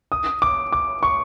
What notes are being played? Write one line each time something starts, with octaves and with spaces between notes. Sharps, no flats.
D#6
D6
D6
C#6